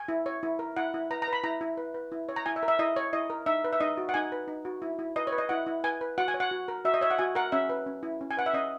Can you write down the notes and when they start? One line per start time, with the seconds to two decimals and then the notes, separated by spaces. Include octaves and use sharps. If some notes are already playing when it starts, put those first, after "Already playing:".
Already playing: G#5
0.08 E4
0.26 C#5
0.43 E4
0.59 A#4
0.77 E4 F#5
0.94 E4
1.11 B4 A#5
1.22 A#5
1.28 B4 B5
1.44 E4 A#5
1.61 E4
1.77 B4
1.94 B4
2.12 E4
2.29 C#5
2.36 A#5
2.46 E4 G#5
2.56 E5
2.63 A#4
2.68 E5
2.79 E4 D#5
2.96 C#5
3.13 E4 D#5
3.30 A#4
3.46 D#4 E5
3.64 B4
3.73 E5
3.81 D#4 D#5
3.97 F#4
4.09 F#5
4.14 D#4 G#5
4.32 B4
4.48 D#4
4.65 F#4
4.82 E4
4.99 E4
5.16 B4 D#5
5.27 C#5
5.32 B4
5.38 D#5
5.49 E4 F#5
5.66 E4
5.84 B4 G#5
6.01 B4
6.18 F#4 F#5
6.28 G#5
6.34 C#5
6.40 F#5
6.51 F#4
6.68 A#4
6.85 F#4 E5
6.94 D#5
7.01 C#5 E5
7.11 F#5
7.19 F#4 G#5
7.35 A#4 F#5
7.52 C#4 E5
7.69 B4
7.86 C#4
8.03 E4
8.21 C#4
8.31 G#5
8.37 B4 F#5
8.46 E5
8.53 C#4 D#5